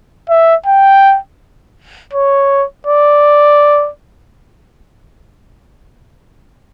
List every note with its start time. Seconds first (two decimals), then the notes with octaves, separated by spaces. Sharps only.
0.29 E5
0.66 G5
2.13 C#5
2.87 D5